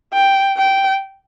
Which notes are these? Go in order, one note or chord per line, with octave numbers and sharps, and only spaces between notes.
G5
G5